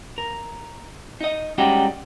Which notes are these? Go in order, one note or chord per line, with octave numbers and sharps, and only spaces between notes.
A#4
D#4 D#5
G3 G#3 C#4 D#4 F#4 G4